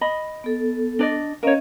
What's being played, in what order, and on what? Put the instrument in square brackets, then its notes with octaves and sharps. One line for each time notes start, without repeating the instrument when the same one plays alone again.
[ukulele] D#5 B5
[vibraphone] B3 A4
[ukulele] D4 D5 D#5
[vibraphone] C#4 D#5 F5 [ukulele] A#4 C#5